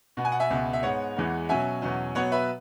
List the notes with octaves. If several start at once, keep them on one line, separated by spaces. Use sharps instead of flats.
B2 B3
G#5
F#5
E5 G#5
C#2 B2 B3
E5
G#2 G#3 B3 C#5 F#5
E2 E3 G#3 B3
B2 F#3 C#4 E5 G#5
E2 B2 F#3 C#4
B2 F#3 B3 C#5 F#5
B4 E5